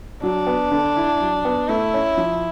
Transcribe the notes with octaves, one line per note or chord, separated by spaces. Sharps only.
F#3 D4
B3
D3
E4
F#3
B3
A3 E4
C#4
F3